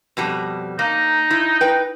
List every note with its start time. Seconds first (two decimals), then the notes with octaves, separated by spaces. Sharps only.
0.17 F2 B2 G3
0.79 A#3 D#4
1.31 E4
1.61 B4 G5